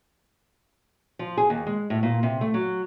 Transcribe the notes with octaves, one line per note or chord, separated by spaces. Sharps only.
F3
G#4
D#2
G#3
A2
A#2
C3
A3
F#3